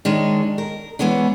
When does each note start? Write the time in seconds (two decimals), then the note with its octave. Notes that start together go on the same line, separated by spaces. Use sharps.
0.05 D#3 G#3 C#4 D4
0.58 A#4
0.99 E3 G#3 B3 C#4 D4